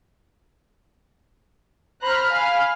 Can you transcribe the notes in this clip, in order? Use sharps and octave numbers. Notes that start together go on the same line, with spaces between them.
C5 A#5 B5 F6 F#6
F5 G#5